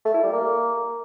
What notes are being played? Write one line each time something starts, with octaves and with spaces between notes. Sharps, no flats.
A3
E4
G3
A#3